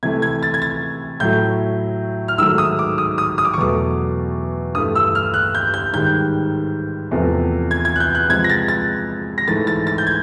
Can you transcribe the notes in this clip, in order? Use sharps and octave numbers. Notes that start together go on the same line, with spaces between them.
C3 E3 A3 G#6
G#6
A6
G#6
A6
A2 F#3 A3 G6
F6
G#2 D#3 F#3 A3 E6
D#6
D6
D#6
D#6
D#6
D6
C#6
E2 B2 F#3 A3 D6
G2 E3 A3 D#6
E6
F6
F#6
G6
G6
G#2 D#3 G3 G6
E2 C3 F3 A3
G#6
G#6
F#6
G6
F#6
C3 F3 G#3 G#6
A#6
A6
A6
A#6
G#2 E3 A3 A6
A6
A6
G6
G#6